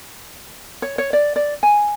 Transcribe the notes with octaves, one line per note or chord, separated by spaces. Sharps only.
C#5
C#5
D5
D5
G#5